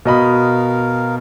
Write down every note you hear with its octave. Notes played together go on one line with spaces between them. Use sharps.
B2 A#4 D#5 F5 B5